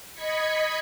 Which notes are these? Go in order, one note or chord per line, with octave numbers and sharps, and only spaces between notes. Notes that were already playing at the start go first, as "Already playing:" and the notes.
D#5 B5 G#6 B6 C#7